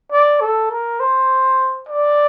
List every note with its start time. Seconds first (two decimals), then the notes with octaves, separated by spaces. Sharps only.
0.12 D5
0.41 A4
0.71 A#4
1.00 C5
1.89 D5